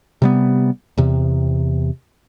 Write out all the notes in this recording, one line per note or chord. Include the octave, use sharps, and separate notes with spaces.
C3 G3 B3
E2 C3